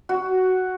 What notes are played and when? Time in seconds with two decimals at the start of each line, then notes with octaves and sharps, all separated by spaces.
0.09 F#4